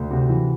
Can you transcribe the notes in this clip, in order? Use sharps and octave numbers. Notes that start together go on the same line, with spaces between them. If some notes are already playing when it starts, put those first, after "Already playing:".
Already playing: D2
C3 F#4
E3